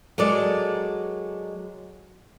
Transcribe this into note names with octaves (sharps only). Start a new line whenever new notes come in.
F#3 G#3 A4 A#4 D5